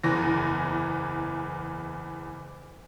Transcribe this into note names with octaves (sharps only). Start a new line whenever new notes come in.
F#1 E2 E3 A#6